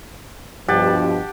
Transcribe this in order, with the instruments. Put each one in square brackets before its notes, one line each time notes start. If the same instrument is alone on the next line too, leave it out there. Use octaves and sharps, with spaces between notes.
[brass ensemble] G2 B2 F3 [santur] G4 F#5 A5